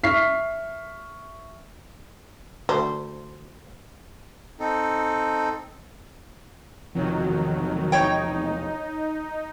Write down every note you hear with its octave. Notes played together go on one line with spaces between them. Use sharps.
E5 C#6 F6 B6 C7
D2 C5
C4 D#4 A4
E1 C3 D#3 F3 F#3
D#4 C#5 G5